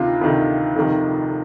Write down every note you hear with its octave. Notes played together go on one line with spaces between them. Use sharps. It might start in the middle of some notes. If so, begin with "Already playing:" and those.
Already playing: D2 C3 D#3 F4
D2 C3 D#3
F1 F2 C3 D#3